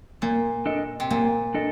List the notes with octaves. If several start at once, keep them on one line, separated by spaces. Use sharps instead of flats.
A#2 A#3
D4 A4 D#5
C3
A#2 A#3
D4 A4 D#5